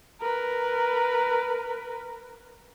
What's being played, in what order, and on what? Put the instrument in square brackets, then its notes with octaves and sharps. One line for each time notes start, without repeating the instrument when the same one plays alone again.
[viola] A#4 B4